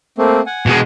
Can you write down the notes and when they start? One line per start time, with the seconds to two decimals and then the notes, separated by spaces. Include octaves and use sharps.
0.18 A3 A#3 C4
0.46 F#5 G#5
0.66 B2 G#3